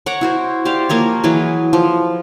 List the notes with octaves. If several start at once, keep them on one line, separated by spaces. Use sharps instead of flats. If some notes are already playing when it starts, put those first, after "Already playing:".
C#5 F#5 A#5 D6
E4 F#4 C5
G4 C5 D5 F5
F3 A#3 A#4 C#5
E3 F#3 G#4 B4
F3